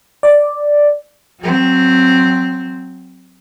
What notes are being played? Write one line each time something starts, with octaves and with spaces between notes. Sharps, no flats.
D5
F#3 C4